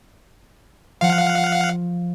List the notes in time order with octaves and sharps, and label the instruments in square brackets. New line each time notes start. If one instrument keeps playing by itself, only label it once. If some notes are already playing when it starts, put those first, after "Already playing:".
[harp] F3 [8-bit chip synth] F5 F#5